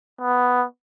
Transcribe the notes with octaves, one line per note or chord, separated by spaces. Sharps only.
B3